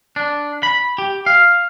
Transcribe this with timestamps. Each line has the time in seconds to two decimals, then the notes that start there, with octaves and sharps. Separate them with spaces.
0.16 D4
0.63 B5
0.98 G4
1.26 F5